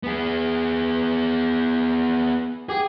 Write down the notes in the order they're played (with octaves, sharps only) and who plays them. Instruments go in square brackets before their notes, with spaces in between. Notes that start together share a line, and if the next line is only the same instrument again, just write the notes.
[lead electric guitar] B3 G#4
[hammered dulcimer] G4 [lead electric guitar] G#4